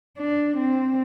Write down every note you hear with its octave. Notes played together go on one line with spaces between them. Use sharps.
D4
C4